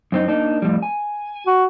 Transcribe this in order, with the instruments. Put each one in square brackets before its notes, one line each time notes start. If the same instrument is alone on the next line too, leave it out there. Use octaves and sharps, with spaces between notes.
[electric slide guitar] F#2 C4 D#4
A#3 D4 D#4
F2 A2 G3
G#5
[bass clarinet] F#4